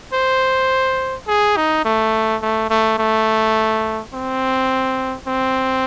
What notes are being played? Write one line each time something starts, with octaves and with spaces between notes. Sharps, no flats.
C5
G#4
D#4
A3
A3
A3
A3
C4
C4